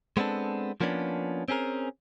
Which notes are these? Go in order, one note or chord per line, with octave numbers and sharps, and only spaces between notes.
G#3 B3 C4 D4 A4
F3 A#3 B3 C#4 D4
C4 C#4 G#4 A#4